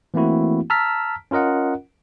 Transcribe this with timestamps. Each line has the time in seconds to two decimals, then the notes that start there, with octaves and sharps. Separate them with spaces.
0.14 E3 A3 A#3 C4 E4 F#4
0.70 A5 A#5 E6 F6 B6
1.31 C#4 F4 A#4 D#5 F#5